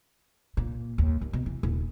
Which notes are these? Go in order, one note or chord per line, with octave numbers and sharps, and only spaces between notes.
A#2
D#2
D#2
B2
E3
D#1